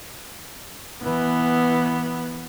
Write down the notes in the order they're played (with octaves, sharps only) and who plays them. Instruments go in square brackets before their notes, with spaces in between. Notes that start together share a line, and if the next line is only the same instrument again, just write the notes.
[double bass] E3 [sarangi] B3